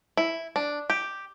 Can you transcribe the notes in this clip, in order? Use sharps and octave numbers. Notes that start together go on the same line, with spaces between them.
E4
D4
G4